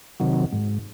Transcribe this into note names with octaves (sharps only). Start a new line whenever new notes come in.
C3 D#3 F#3
G#2